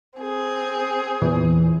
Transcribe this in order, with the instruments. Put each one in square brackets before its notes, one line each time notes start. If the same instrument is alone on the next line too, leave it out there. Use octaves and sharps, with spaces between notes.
[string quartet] C4 G#4
[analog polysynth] E2 A#2 E3